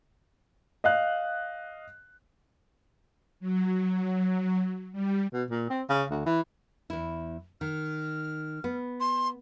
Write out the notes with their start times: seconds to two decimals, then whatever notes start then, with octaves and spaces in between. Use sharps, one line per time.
0.84 D#5 F5 F#6
3.40 F#3
4.92 G3
5.33 B2
5.50 A#2
5.70 C4
5.89 C#3
6.10 D2
6.26 E3
6.90 E2 E4
7.61 D#3 F6
8.64 B3
9.00 C6